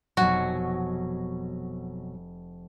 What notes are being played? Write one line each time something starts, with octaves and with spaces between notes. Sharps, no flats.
F1 B2 F#3 F#4 G#5